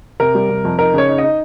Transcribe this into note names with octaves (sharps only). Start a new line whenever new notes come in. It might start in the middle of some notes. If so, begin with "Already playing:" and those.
C3 A#4
G3
C3
F2
D#4 A#4
C#3 C#5
D#4
D#5
D#4